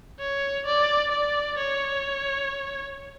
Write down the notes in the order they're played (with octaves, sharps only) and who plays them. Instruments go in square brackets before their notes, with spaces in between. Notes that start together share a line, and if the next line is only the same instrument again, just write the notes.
[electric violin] C#5
D5
D5
C#5